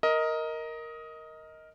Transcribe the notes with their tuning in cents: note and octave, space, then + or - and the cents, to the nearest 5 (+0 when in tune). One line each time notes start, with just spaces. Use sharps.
A#4 +0 D#5 +15